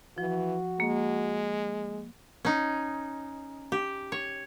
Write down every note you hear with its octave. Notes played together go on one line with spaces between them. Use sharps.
E3 F3 F#4
G#3 A#3
C#4 D#4
G4
C#5